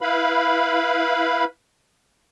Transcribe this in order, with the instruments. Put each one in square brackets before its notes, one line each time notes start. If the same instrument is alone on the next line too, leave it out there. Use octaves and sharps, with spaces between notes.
[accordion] E4 B4 F5 B5